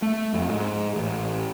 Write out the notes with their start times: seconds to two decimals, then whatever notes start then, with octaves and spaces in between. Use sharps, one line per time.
0.02 A3
0.34 F2
0.48 G#2
0.95 A1